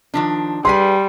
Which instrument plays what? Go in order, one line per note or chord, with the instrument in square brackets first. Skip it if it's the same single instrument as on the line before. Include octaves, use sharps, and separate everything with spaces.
[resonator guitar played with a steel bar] D#3 F3 D4
[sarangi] G3 [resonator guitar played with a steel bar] G#4 B4 G#5 [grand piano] C6